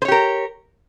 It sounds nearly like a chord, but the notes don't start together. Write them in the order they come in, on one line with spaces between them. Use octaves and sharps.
C5 C#5 G4 A#4